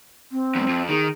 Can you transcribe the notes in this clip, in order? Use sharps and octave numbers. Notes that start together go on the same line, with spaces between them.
C4
E2 G#2
F2
D#3 G#4